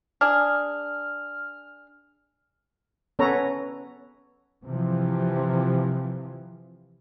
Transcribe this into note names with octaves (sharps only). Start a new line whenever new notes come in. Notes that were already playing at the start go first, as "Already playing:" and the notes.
D4 G#4 F6
B3 C#4 A4 B4 C#5 A#5
C3 E3 F3